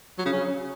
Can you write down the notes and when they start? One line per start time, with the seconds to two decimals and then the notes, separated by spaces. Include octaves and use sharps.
0.19 F#3
0.26 C#3
0.33 C#4